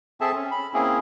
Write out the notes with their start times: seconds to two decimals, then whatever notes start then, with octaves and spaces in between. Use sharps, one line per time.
0.21 C4 G#4 A4 E5 A5
0.35 C#4
0.51 B5
0.74 A#3 C4 C#4 E4 G#4